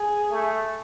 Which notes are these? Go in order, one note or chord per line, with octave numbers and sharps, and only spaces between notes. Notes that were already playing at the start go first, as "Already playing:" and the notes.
Already playing: G#4
A3